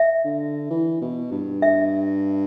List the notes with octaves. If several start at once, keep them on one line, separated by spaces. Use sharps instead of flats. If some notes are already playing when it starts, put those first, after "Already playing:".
Already playing: E5
D3
E3
B2
G2
E5